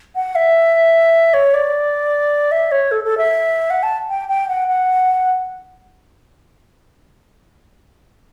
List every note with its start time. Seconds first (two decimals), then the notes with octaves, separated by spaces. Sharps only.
0.16 F#5
0.35 E5
1.34 C#5
1.54 D5
2.52 E5
2.71 C#5
2.91 A4
3.04 A4
3.18 E5
3.70 F#5
3.83 A5
4.09 G5
4.29 G5
4.48 F#5
4.68 F#5